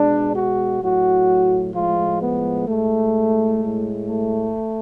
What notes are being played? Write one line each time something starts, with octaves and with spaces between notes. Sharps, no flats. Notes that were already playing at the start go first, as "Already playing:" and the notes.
Already playing: B2 G#3 D4
F#4
A2 F#3 F#4
A2 F3 G#3 F4
B3
A2 G#3 A3
A2 G#3
A3